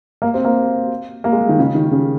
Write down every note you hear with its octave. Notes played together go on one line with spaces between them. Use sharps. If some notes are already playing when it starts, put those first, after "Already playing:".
A#3
C4
A#3
A#3
G#3
G3
D#3
C#3
D#3
C#3